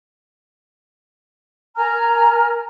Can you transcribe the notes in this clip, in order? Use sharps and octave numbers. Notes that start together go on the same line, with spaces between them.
A#4 G#5 A#5 F6